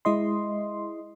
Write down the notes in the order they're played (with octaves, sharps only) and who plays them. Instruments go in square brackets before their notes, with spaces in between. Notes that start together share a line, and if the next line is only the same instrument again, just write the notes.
[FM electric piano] G#3 E4 D#5 C6